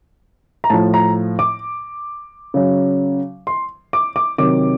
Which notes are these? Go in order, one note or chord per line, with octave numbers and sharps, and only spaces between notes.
A#5
A2 F3 A5
A#5
D6
C#3 F#3
C6
D6
D6
C3 D#3 F#3 D6